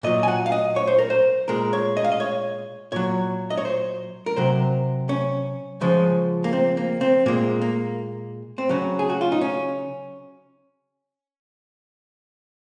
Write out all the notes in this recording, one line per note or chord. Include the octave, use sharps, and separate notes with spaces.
A#2 F#3 D#5
G#5
F#5
F5
D#5
C#5
C5
A#4
C5
A#2 G#3 A#4
C#5
D#5
F5
D#5
C#5
A#2 F#3 C#5
D#5
C#5
C5
A#4
C3 F#3 C5
C#4
C#3 F3 G#3
A#3
C4
A#3
C4
A#2 G#3 A#3
A#3
C4
C#3 F#3 C#4
G#4
F#4
F4
D#4
C#4